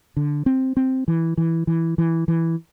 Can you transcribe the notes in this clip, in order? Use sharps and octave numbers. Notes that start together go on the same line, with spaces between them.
D3
C4
C4
E3
E3
E3
E3
E3